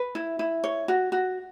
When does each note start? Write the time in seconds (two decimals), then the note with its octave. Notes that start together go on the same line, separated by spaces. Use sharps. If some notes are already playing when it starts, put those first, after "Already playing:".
Already playing: B4
0.15 E4
0.39 E4
0.64 C#5
0.88 F#4
1.12 F#4